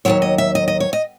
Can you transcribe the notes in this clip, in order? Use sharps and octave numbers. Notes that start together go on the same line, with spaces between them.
D#2 D#3 F#3 C#5
D#5
E5
D#5
D#5
C#5
D#5